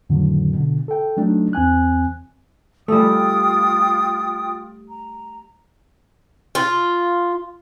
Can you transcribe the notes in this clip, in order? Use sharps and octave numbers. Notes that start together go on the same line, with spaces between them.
F2 A2 D3 D#3 F#3
B2 D3
A4 G5
F#3 A3 D4 D#4
E2 C4 G#5 F#6
G3 A3 F4 G5 D#6
A#5
F4